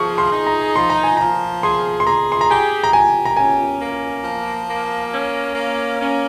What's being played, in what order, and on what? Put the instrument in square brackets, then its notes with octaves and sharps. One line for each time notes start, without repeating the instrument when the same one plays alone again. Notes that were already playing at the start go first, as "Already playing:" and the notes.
Already playing: [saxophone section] F3 G#4 [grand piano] C#6
[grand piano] C6
[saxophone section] D#4
[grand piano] A#5
[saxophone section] F3 [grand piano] C6
[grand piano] A#5
G#5
[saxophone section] F3 [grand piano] A#5
[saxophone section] G#4 [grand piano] C6
[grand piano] C6
[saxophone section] G#4 [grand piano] A#5
[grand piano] C6
A#5
[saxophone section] G4 [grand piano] G#5
[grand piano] A#5
[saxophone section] G4 [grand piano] G#5
[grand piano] A#5
[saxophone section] C#4 [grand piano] G#5
[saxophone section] A#3
F3
A#3
C#4
A#3
C#4